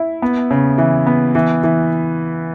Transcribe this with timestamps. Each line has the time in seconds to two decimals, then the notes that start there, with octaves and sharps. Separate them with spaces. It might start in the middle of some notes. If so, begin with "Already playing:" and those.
Already playing: E4
0.22 B3
0.51 C#3
0.78 E3
1.06 B3
1.35 E3
1.64 E3